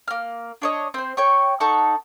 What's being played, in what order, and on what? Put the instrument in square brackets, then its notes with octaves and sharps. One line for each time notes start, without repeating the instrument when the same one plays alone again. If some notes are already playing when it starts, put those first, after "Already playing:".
[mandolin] A#3 F6
D4 C#5 D#5
C4 C5
C#5 G5 C#6
D#4 A4 F#5 C#6